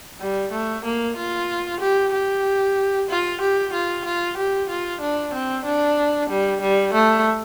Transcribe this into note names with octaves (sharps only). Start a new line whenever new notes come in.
G3
A3
A#3
F4
G4
G4
F4
G4
F4
F4
G4
F4
D4
C4
D4
G3
G3
A3